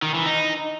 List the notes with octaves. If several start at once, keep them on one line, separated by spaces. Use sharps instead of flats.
D#3
E3
D#4